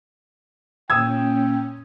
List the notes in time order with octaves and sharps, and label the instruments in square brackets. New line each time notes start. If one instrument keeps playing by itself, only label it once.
[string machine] A#2 C#4 [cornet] G5 [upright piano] D#6 E6 G#6